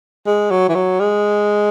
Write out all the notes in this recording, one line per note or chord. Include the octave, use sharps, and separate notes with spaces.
G#3
F#3
E3
F#3
G#3